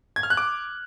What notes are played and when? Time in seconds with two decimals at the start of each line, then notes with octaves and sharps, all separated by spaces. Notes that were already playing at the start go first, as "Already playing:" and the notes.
0.16 G#6
0.23 F6
0.30 F#6
0.37 D6